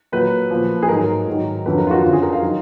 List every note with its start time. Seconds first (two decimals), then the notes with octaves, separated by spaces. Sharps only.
0.12 A#2 F#3 B4
0.51 A#2 F3
0.82 G#4
0.89 G#2 F#3 A#4
1.27 G#2 D#3 F#3
1.66 F2 D3 F#3 B4
1.78 A#4
1.87 F4
1.91 F#4
2.03 F#2 D3 F3 F4
2.13 G#4
2.23 A#4
2.33 F5
2.42 D#3 F#3